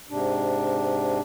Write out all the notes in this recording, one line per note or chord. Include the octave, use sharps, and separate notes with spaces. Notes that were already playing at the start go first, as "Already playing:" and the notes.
G#2 C3 D4